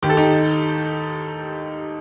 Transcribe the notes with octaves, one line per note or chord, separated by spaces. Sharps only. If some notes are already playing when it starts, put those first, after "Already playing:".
D#2 D#3 G4
A4
D#4 G4